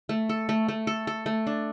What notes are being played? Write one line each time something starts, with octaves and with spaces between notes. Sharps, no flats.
A3
A4
A3
A3
A4
A4
A3
D4